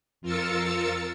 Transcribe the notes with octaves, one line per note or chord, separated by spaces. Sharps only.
F2 F4 A#4 E6 A6 C#7